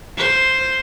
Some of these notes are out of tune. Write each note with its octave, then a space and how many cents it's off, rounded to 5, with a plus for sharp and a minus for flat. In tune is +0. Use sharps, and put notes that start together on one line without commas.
F4 +0 C5 +0